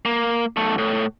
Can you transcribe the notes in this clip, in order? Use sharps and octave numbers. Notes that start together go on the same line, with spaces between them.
A#3
B1 A3
A2